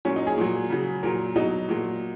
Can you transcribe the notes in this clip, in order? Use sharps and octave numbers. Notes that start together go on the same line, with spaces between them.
A#2 F#3 C#4
D#4
G#4
A#2 F#3
C#3 F#3
A#2 F#3 A#4
B2 F#3 D#4
A#2 F#3